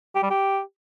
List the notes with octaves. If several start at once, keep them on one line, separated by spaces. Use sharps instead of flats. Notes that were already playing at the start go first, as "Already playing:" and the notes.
G4
G3
G4